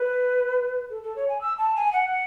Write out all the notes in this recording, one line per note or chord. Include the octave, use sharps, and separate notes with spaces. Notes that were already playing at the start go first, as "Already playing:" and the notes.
Already playing: B4
A4
A4
C#5
G#5
E6
A5
G#5
F#5